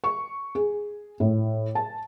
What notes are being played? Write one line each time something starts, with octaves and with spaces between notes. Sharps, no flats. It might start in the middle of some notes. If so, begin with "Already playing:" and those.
C#6
G#4
A2
A5